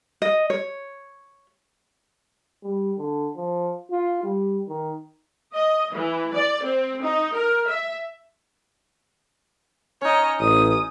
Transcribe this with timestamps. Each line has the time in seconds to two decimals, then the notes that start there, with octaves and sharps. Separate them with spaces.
0.22 D#5
0.50 C#5
2.63 G3
2.98 D3
3.36 F3
3.90 F4
4.24 G3
4.68 D#3
5.55 D#5
5.93 E3
6.35 D5
6.64 C4
7.04 D#4
7.35 A#4
7.68 E5
10.01 C#4 D#4 C#5 D#5
10.40 A1 D#6